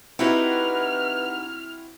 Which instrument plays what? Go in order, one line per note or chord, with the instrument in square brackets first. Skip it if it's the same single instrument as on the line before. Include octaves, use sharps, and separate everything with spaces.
[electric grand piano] C4 E4 F#4 [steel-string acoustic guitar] D#4 G4 F#5 [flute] B4 [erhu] F6